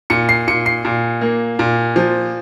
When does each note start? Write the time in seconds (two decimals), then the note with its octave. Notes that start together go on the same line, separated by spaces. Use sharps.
0.10 A#2 C#7
0.29 C7
0.47 A#2 C#7
0.66 C7
0.85 A#2
1.21 A#3
1.59 A#2
1.96 F3